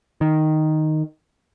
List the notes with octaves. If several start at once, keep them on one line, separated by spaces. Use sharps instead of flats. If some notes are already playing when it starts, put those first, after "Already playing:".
D#3